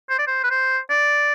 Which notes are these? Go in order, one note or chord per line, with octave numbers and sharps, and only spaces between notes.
C5
D5
C5
B4
C5
D5